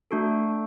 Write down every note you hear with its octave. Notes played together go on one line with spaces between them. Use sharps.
A3 D4 F#4 A4